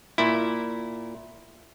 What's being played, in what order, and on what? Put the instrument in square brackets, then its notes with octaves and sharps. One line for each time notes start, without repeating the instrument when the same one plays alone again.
[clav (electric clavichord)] A#2 E4